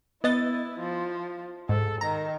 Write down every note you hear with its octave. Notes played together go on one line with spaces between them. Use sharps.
B3 E4 D#5 A6
F3
G#2 A4
D#3 A#5